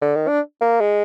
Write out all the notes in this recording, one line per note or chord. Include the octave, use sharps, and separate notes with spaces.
D3
D#3
D4
A#3
G#3